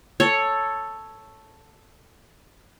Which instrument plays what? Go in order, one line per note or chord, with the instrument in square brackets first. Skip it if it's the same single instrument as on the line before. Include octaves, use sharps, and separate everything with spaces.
[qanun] A4 C#5